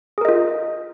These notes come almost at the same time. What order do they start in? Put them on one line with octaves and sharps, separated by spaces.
G#4 A#4 D#5 F4